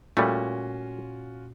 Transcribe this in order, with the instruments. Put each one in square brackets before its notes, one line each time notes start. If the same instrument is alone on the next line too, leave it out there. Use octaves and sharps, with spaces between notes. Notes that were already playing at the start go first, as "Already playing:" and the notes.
[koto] A#2 [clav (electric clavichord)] G3 A3 [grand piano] C#4 F4 F#4